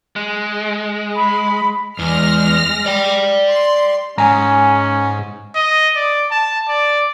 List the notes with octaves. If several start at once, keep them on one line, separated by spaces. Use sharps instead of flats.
G#3
B5
E2 G#3 F6 A#6
D5 G5
C6
G#2 C#4 G#5 A#5
D#5
D5
A5
D5